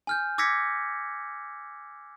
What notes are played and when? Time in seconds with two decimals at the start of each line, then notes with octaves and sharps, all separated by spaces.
0.07 G#5 F6 G6
0.38 D6 E6 G#6 A#6 B6 C#7